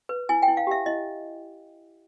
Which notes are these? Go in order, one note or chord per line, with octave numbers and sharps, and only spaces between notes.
B4
E4 G#5
G5
E4
F5
G4 E5
E4 D#5